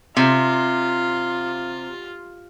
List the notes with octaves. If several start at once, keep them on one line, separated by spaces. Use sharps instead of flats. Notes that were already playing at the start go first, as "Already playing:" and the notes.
C3 F4